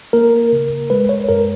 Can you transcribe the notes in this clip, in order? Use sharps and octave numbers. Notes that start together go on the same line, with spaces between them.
A#3 A#4
C#3
G#3 B4
C#5
F#2 A#4